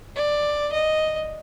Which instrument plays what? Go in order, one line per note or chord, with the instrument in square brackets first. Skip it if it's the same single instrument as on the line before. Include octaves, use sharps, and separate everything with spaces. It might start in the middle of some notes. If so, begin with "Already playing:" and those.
[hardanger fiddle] D5
D#5